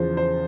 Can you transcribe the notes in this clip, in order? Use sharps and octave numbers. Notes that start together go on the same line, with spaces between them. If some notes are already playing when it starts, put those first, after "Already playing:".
Already playing: E2 C#3 F3 C5
C5